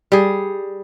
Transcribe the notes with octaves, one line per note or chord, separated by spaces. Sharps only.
G3 G#4